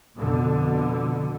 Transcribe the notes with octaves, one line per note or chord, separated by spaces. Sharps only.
F2 B2 D3